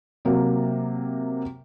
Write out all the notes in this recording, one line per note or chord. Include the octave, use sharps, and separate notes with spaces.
C3 F#3 A#3